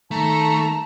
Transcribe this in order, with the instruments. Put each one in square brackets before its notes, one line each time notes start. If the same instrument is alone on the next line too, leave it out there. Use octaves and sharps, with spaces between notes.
[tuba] D#3 [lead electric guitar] A3 [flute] A5 [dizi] A#5